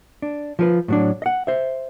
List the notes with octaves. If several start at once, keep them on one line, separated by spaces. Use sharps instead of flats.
D4
F3 F4 B4
A2 F#3 D4
D#5 F#5
C5 E5